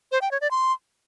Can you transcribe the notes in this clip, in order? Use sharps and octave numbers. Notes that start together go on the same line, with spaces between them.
C5
G5
C#5
D5
C6